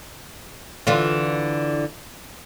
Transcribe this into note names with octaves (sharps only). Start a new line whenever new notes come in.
D3 E3 F4